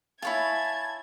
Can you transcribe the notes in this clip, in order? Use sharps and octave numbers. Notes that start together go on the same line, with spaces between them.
E4 C#5 F5 G#5 A5 B5 G#6